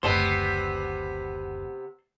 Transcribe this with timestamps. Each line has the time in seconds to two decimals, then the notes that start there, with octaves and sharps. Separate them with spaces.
0.03 F#1 D2 C3 B3 D5 A5 C6